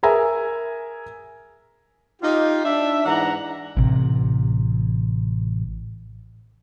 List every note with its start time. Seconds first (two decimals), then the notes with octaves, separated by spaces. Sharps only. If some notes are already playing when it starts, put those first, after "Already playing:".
0.03 G#4 A#4 E5 G#5 A#5
2.22 D#4 F4 G4
2.63 D4 E5
3.05 G#2 E3 D4 F#5 A#5
3.77 A1 C3